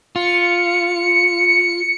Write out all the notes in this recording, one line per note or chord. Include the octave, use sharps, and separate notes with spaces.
F4 C#7